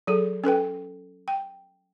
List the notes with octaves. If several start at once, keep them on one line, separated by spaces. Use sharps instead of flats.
F#3 G#4 A4
C#4 A4 B4 G5
G5